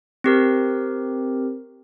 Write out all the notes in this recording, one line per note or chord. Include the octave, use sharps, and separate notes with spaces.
C4 G4 A#4